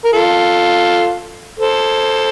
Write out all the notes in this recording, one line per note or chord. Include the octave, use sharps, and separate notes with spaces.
A#4
F4 A4
A4 C5